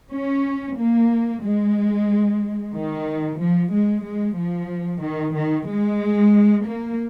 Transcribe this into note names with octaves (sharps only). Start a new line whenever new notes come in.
C#4
A#3
G#3
D#3
F3
G#3
G#3
F3
D#3
D#3
G#3
A#3